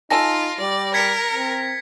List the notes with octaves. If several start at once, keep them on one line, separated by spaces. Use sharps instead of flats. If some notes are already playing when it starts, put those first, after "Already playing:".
D#4 F4 A4 G#5 A5 A#6
G3 D5
A#4 G#6 B6 C#7
C4